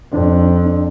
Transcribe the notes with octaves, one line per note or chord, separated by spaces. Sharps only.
F2 D4
D4
D4
D4